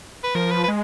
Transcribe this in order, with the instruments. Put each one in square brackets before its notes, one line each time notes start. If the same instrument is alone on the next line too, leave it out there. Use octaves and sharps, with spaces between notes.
[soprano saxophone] B4
[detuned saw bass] F3 [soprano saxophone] A#4
[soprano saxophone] B4
B4
[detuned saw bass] G#3